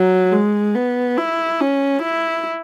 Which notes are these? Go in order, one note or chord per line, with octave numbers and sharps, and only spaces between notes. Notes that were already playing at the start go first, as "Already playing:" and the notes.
Already playing: F#3
G#3
B3
E4
C#4
E4